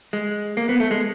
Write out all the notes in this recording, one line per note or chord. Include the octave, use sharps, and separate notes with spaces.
G#3
A#3
B3
A3
G#3